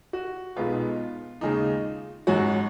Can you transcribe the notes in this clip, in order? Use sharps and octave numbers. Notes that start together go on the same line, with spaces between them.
F#4
B1 B2 G#3 B3 D#4 F4
D#2 C#3 G#3 D#4
G#1 G#2 F#3 C#4 F#4